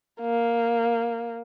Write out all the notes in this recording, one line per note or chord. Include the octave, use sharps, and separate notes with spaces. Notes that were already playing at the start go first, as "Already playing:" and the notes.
A#3